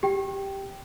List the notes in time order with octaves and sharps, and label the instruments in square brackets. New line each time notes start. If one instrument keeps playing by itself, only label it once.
[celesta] G4 G5